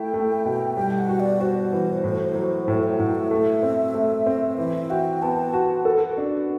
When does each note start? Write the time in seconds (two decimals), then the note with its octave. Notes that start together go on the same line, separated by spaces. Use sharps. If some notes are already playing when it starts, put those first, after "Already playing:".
Already playing: A3 E4 G5
0.14 A3
0.45 B2
0.77 G3 G5
0.98 F#5
1.09 F#4
1.20 D5
1.41 F#4 C5
1.72 E3
2.04 A2
2.35 F#3
2.68 A2 C5
2.83 G5
2.99 A2 F#5
3.15 E5
3.31 A3
3.63 C4
3.94 A3
4.26 C4
4.58 E3 E5
4.90 F#4 G5
5.22 B3 A5
5.54 F#4
5.85 A4
6.18 D4